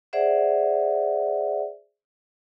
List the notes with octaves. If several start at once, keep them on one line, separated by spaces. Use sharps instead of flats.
G#4 C5 D5 E5 F#5